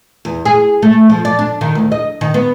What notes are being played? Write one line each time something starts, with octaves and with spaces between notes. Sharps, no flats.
E2
G#4
A3
F3
D5
D4
D#3
D2
D#5
D#3
B3